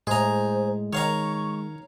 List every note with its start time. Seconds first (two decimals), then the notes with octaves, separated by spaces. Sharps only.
0.07 A2 G#3 G#4 C5 A#5
0.93 D#3 C#5 F5 A#5 C#6